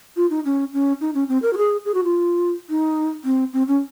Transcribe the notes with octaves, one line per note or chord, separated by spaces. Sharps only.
F4
D#4
C#4
C#4
D#4
C#4
C4
A#4
F#4
G#4
G#4
F#4
F4
D#4
C4
C4
C#4